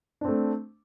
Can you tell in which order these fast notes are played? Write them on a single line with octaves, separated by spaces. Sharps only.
D4 C4 A3